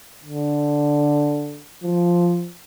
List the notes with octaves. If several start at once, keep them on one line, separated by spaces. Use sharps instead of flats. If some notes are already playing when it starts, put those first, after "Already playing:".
D3
F3